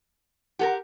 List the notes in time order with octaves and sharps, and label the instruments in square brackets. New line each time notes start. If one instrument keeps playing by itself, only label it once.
[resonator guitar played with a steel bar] G4 A4 A#4 [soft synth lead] F#5